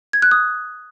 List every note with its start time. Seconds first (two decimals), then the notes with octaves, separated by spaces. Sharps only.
0.13 G#6
0.22 F#6
0.31 D#6